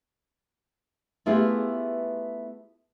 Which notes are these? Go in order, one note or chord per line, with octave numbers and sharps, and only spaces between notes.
A3 B3 E4 F4 G4 G#4